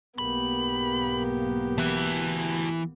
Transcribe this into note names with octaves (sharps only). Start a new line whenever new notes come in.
B1 G#2 A#3 B3 G4 B5
E3 A3 F#4